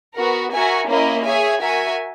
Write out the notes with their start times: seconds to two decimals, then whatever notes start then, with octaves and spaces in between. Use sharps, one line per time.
0.16 B3 F#4 A#4
0.51 F#4 A#4 E5 G#5
0.89 A#3 C#4 E4 A#4 D#5
1.25 G#4 C#5 E5 G#5
1.61 F#4 A#4 E5 G#5